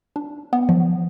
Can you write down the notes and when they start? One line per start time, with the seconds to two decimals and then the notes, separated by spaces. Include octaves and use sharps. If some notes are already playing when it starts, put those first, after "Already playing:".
0.16 D4
0.53 B3
0.69 F3